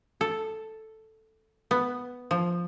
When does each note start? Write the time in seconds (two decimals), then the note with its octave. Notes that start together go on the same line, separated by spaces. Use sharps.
0.21 A4
1.71 B3
2.31 F3